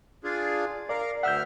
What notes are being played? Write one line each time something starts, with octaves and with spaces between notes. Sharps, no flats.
D4 F4 G#4
A#4 D5 F5
D2 E5 F#5 E6 F6 G6